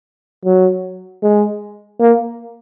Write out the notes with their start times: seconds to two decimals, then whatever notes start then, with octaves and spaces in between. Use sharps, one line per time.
0.45 F#3
1.23 G#3
2.00 A#3